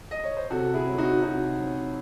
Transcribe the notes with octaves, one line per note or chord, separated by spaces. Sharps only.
D#5
C#5
C5
C3 F#4 A4
E4 G#4
F#3 C4
D#4 F#4
C3 D#4 F#4
F#3 C4